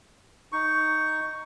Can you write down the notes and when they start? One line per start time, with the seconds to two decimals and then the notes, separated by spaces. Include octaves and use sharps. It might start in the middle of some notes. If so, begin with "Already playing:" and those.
0.52 D#4 C#6